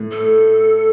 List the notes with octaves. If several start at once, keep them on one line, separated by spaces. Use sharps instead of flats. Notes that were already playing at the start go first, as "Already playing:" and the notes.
Already playing: A2
A4